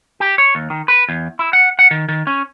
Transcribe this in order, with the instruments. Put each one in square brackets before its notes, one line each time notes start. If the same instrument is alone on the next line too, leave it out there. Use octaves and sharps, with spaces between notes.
[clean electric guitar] G4
C#5
D#2
D#3
B4
E2
E4
F#5
F#5
D#3
D#3
C#4